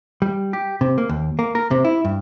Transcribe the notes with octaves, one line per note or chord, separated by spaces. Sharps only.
G3
G4
C3
A#3
D#2
A#3
A#4
C3
E4
G2